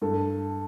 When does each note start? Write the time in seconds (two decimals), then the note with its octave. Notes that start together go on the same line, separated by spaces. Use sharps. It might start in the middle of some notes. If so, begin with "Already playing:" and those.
0.02 G2 A4